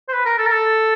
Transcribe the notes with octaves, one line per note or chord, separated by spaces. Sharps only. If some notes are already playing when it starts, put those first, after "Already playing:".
C5
B4
A#4
A4
A#4
A4